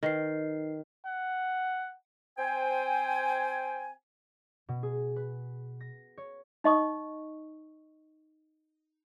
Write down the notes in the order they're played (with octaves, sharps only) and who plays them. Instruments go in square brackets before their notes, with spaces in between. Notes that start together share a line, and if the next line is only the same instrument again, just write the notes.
[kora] D#3 [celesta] D#4 B4 C7
[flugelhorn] F#5
[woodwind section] C4 C5 G5 G#5
[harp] B2
G#4
B4
A#6
C#5
[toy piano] D#4 D#5 C#6 D#6